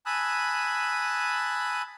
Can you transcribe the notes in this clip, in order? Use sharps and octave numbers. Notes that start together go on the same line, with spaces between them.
G#5 A5 B5 D#6 E6 F#6